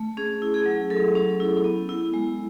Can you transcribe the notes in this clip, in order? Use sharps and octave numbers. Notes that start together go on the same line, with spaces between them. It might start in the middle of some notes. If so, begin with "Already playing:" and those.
Already playing: A3
C#4 G#4
E4
G#4
F#3
F#3 A4
C#4
E4
B3
E4
G#3